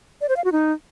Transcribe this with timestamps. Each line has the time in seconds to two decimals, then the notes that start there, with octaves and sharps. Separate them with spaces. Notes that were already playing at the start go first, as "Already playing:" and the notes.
0.21 D5
0.29 C5
0.37 F5
0.44 F#4
0.52 D#4